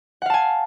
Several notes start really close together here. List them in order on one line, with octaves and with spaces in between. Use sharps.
F#5 F5 A5 G#5